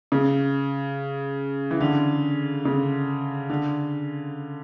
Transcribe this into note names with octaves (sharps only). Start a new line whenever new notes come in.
C#3
E3
D3
C#3
D3